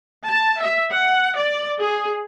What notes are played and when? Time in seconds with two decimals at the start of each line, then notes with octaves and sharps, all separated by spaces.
0.24 A5
0.59 E5
0.91 F#5
1.38 D5
1.79 G#4